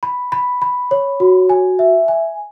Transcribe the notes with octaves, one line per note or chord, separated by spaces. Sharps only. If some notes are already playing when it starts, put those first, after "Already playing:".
B5
B5
B5
C#5
F#4
G#5
E5
G#5